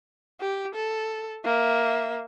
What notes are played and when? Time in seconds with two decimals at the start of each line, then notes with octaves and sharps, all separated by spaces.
0.41 G4
0.75 A4
1.45 A#3 E5